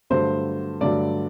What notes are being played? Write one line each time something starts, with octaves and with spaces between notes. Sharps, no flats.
G2 D3 F#3 A3 C5
G2 D3 F#3 A3 D5